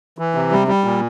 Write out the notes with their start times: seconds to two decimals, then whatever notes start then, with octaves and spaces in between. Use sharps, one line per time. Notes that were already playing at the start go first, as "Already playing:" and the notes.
0.18 E3
0.35 C3
0.52 G3
0.67 G3
0.84 A#2